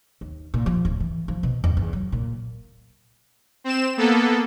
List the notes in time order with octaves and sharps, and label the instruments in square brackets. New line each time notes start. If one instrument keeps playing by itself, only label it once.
[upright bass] D#2
A#2
F3
D1
E3
F3
B2
F2
E2
F#3
A#2
[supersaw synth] C4 E7
A#3 B3 A4